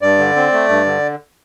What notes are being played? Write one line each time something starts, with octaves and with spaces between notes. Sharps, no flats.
G2 D5
D3
C4
A3
G2
D3